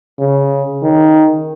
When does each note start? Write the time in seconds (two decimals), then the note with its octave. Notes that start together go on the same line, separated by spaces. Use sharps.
0.19 C#3
0.82 D#3